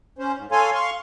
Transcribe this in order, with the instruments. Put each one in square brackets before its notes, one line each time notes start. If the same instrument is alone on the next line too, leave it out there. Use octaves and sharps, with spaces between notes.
[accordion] C#4 C5
G#2
A4 C#5 F5 G#5 C6
F5 C6 C#6